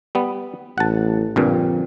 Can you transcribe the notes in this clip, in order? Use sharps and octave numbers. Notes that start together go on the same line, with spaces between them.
G3 B3
A1 F#5 A5
A#1 G2 A#2 D3 F3 C4